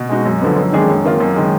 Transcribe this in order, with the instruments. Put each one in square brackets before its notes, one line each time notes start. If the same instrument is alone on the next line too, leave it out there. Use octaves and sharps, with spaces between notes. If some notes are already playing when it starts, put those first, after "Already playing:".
Already playing: [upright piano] B2
G#3 D#4 F#4
F#2
D3 F3 B3
F#2
D#3 G#3 D4 G#4
F#2
D#3 A#3 F4
F#2
D#3 G#3